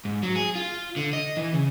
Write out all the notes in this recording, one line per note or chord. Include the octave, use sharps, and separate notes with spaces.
G#2
F#3
G#4
F4
D3
D#5
E3
C#3